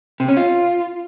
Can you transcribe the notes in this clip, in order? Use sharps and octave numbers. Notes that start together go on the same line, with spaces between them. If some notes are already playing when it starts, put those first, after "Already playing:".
C3
C#4
F4